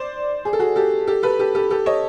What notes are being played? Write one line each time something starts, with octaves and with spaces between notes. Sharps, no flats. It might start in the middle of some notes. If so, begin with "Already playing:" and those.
Already playing: C5 D5
G#4
A4
F#4 G#4
G4 A4
G4 A4
A4 B4
G4 A4
G4 A4
G4 A4
C#5 D#5